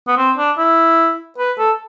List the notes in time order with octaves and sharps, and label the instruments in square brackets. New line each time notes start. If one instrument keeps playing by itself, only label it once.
[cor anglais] B3
C4
D4
E4
B4
A4